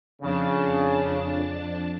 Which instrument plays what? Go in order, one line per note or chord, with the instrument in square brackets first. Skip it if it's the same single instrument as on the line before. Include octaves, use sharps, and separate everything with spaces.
[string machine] F2 D4 A5 [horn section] C#3